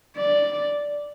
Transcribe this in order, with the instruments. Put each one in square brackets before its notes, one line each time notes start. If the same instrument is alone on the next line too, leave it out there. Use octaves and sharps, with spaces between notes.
[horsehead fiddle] D5